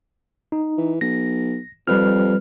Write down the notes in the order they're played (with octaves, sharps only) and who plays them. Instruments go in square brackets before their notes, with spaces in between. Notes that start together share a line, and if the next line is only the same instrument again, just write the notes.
[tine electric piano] D#4
[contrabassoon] E3
[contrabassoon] B1 [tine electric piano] A#6
[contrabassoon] F2 [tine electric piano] G3 B4 F6